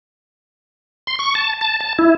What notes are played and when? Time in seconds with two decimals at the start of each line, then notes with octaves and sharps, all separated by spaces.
1.07 C6
1.19 C#6
1.35 A5
1.61 A5
1.81 A5
1.99 E4